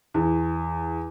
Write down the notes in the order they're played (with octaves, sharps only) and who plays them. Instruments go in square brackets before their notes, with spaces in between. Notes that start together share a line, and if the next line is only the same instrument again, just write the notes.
[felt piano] E2